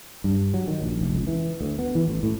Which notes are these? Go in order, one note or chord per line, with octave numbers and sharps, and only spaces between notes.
G2
F#3
D#3
A#1
F1
C#2
E3
D2
B3
E3
A1
A2